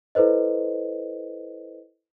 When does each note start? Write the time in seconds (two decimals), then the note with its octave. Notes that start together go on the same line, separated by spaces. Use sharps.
0.15 E4 A4 B4 C5 D#5